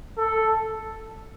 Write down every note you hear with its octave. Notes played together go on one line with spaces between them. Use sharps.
A4